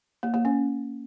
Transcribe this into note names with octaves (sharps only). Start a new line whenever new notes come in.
A#3
A#3
C#4